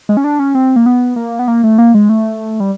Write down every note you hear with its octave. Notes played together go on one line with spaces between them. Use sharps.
G#3
C#4
D4
C#4
C4
A#3
B3
A#3
B3
A#3
A3
A#3
G#3
A3
G3